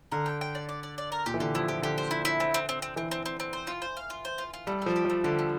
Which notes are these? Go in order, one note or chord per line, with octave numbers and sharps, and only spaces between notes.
D3 A#4
G5
G5
D5
D5
D5
D5
A#4
A#2 G4
E3
D3 G4
F3 E4
F3 G4
D3 G4
C5
E4
E4
C4
C4
C4
C4
E3 C4
C4
C4
C4
C5
F4
C5
F5
F4
C5
F4
F4
G3 A3
F3 A3
G4
F3 A3
D3 G4
A3